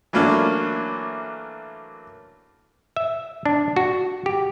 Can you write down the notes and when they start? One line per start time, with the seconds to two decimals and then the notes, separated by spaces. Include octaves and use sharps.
0.13 E3 F#3 A3 A#3 C#4 D4
2.96 E5
3.45 D4
3.76 F#4
4.26 G4